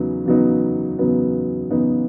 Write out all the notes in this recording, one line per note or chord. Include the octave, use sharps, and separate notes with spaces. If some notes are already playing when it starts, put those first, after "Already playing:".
Already playing: E2 C#3 F#3 B3 D#4
E2 C#3 F#3 B3 D#4
E2 C#3 F#3 B3 D#4
E2 C#3 F#3 B3 D#4